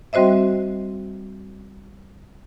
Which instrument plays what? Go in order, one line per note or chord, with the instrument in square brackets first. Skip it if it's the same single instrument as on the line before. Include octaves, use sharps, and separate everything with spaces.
[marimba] G3 C4 F#4 C5 D#5 E5